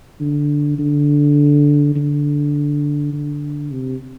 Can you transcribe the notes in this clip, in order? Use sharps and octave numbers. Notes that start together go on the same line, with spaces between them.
D3
D3
D3
D3
C3